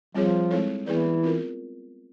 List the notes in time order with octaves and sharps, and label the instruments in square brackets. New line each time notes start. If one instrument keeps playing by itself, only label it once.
[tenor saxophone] F3 [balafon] G3 C4 F4 G#4 C#5
[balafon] G#3 C4 E4 A4 C#5
[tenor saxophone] E3 [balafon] B3 E4 G#4 B4 D5
[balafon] C4 F4 A#4